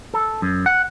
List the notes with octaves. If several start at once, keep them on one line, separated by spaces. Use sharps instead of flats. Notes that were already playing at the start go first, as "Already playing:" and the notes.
A4
F#2
F#5